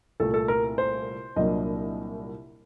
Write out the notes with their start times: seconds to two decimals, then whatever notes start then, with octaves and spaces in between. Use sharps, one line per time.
0.20 C2 A#2 A3 A4
0.34 A4
0.48 A#4
0.78 C5
1.36 C2 A#2 F#3 A#3 D4 D#5